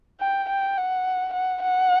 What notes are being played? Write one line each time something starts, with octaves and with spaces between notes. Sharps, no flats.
G5
G5
F#5
F#5
F#5